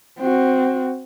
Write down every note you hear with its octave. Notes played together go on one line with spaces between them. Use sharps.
C4 F#4